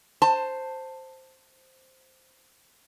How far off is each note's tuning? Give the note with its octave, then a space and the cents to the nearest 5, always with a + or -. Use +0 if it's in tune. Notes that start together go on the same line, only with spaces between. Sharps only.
C5 +0 A5 +15